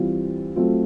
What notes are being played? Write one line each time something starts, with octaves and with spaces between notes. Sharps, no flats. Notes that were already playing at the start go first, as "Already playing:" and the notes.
Already playing: E3 G3 C4 F4
F#3 A3 C4 F4